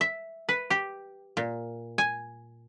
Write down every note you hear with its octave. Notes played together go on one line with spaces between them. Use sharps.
E5
B4
G4
A#2
G#5